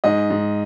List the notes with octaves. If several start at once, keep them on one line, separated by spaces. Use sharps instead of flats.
G#2 D#5
G#2